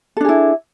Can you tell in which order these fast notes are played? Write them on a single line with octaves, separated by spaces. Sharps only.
A4 D4 G#4 E4